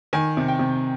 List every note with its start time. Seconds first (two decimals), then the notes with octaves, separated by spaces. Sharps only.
0.13 D#3 G#5
0.37 C3
0.48 G5
0.59 C3